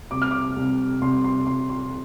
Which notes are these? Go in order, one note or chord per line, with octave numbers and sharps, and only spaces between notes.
C2 D6
F6
D6
C2
C2 C6
C6
C2 C6
C6